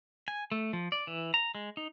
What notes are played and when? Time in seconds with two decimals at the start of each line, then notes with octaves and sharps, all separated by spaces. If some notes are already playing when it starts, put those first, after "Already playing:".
0.28 G#5
0.52 A3
0.73 F3
0.92 D5
1.07 E3
1.34 A#5
1.55 G#3
1.77 D#4